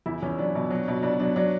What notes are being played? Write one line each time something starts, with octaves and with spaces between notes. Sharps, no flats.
E2 E4
E2 C#4
F#3 D4
B2
F#3
B2
B2 D4
F#3 D4
F#3 D4